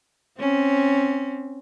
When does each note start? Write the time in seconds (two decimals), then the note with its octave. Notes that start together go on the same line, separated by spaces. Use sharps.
0.39 C4 C#4